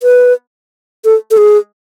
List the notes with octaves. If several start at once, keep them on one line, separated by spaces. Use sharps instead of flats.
B4
A4
A4
G#4